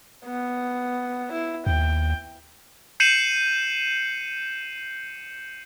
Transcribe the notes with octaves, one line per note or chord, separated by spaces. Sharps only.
B3
E4
D#2 G5
G6 C7 C#7 D#7 E7 F#7